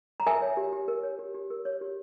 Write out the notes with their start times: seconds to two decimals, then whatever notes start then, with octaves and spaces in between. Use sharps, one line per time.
0.20 A#5
0.26 A#4 E5 G#5
0.42 C#5
0.57 G4
0.73 G4
0.88 A#4
1.03 C#5
1.19 G4
1.34 G4
1.50 A#4
1.65 C#5
1.81 G4